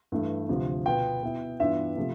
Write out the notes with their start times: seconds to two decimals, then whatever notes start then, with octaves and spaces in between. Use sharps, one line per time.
0.12 G2 E3 A3
0.49 D2 C3 F3
0.86 B2 B3 F4 G5
1.23 B2 B3 E4
1.60 G2 E3 B3 D4 F4 E5
1.97 C3 F3 A3